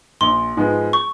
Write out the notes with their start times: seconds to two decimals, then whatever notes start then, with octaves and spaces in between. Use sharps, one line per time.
0.21 A#1 C6
0.57 G#2 F3 G#3 B3
0.93 C#6